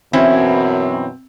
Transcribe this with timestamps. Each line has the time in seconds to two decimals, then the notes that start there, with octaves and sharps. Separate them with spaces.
0.13 F#2 B2 E3 C4 C#4 E4